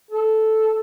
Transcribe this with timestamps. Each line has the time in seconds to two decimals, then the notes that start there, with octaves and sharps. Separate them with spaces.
0.11 A4